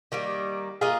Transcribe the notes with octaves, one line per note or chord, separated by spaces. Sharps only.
D#3 G3 A#3
A#3 F4 G#4 D#5